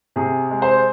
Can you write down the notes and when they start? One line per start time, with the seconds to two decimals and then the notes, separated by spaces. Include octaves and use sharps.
0.16 C3 G#4
0.51 G#3
0.62 C5